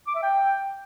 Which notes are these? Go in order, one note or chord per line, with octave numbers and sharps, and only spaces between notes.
D6
E5
G5